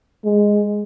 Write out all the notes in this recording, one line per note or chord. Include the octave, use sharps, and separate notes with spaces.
G#3